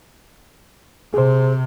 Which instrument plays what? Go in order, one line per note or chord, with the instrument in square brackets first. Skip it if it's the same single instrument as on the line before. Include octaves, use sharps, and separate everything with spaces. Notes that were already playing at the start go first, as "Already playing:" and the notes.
[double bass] C3 [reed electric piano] G#4 C5